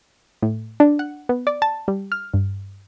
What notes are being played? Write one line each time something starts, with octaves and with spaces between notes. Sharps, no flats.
A2
D4
F#5
B3
D5
A5
G3
F6
G2